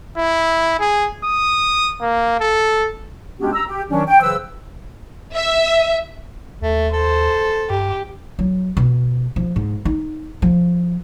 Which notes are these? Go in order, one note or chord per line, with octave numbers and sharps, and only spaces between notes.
E4
G#4
D#6
A#3
A4
G#3 B3 C#4 D4 F#4 G4
A#5 E6
G4
D#3 F#3 C#4 D4
G5
C#3 E3 F#3 B4 C5 E6
E5
D#2 A3
A4 C5
G2 G4
F#3
B2
F3
G#2
D#4
F3